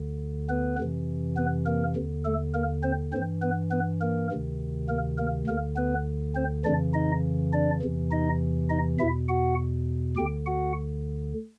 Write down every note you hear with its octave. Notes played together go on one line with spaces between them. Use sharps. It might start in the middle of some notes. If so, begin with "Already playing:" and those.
Already playing: D2 D3
B3 B4
F2 C3 E3
B3 B4
A#3 A#4
D#2 D3
A3 A4
A#3 A#4
C4 C5
G2 E3 C4 C5
B3 B4
B3 B4
A#3 A#4
D2 C3 D#3
A#3 A#4
A#3 A#4
D2 D3 A#3 A#4
B3 B4
C4 C5
F2 C#3 E3 D4 D5
D#4 D#5
D4 D5
E2 C3 E3
D#4 D#5
D#4 D#5
E2 B2 E4 E5
F#4 F#5
D2 D3 G4 G5
F#4 F#5